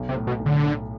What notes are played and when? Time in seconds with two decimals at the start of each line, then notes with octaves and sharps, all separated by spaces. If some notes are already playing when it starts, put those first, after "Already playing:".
Already playing: B1
0.09 C3
0.16 A2
0.27 B2
0.39 B1
0.46 D3
0.64 A2